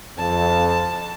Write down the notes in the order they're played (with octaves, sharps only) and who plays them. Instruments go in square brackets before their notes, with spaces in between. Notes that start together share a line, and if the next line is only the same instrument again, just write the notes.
[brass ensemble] F2 [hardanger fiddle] A5